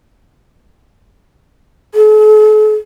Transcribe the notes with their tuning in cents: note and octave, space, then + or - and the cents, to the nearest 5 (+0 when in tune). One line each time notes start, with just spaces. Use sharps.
A4 -45